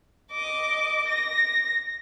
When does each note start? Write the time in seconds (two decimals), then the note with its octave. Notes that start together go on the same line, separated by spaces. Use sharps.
0.32 D#5 D6
1.08 A#6